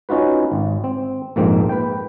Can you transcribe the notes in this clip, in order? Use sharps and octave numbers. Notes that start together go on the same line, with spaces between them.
C#4 D#4 F4 F#4 B4
G#1
C4
A#1 F2 G#2 A#3 C4
B4 G5